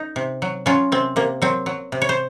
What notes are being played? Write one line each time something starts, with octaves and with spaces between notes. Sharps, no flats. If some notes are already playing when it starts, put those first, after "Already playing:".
Already playing: D#4
C3
F#3
F#3 C#4 F4
C3 C4
C3 A#3
F#3 C4
F#3
C3
C#5
C5